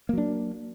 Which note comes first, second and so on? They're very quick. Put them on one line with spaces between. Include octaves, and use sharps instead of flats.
A#3 F#3 D4